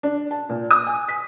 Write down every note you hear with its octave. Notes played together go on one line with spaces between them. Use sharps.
D4
A5
A#2
D#6
G#5
B6